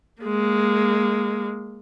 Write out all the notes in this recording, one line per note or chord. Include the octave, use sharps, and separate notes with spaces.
G#3 A#3